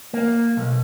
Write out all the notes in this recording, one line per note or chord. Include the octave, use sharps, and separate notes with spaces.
A#3
B1